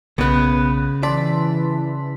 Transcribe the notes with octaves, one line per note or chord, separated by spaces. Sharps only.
B1 C#3 B3 B4 F#6
E3 D5 A5 C6 B6